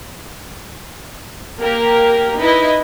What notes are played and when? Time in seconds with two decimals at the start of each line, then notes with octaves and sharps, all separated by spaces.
1.60 A#3 G4 A#4
2.39 D#4 E4 B4 D#5